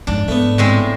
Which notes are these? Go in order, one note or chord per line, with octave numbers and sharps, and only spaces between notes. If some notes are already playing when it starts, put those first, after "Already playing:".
F2 G#2 D4
G#2 A3 B3
A2 G#3 C4